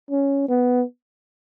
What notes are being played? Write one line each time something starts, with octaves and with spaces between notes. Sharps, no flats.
C#4
B3